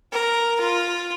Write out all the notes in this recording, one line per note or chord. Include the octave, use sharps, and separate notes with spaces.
A#4
F4